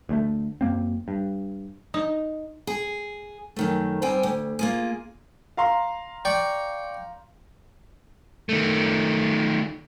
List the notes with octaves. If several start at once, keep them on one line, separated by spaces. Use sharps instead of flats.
D2 G#3 A3
F#2 A#3 C4
G2
D#4
G#4
F#2 D#3 A3
G2 G3 C4 G5 G#5
D2
A#3 F4 G#4
F5 A#5 C6
D5 G5 C#6
D#3 A3